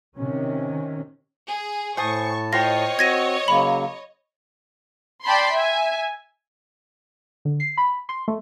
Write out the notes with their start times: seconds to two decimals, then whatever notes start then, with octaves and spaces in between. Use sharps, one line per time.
0.17 C3 D#3 C#4
1.47 G#4
1.97 A2 C5 G#5 A5 C#6 D#6
2.53 F4 C5 C#5 D#5 G5 A#6
2.99 C4 F#4 G#6 A#6 D#7
3.48 C#3 F#3 A#3 B5
5.24 D5 G5 A5 B5 C6
5.54 E5 G#5
7.45 D3
7.60 C7
7.77 B5
8.09 C6
8.28 A3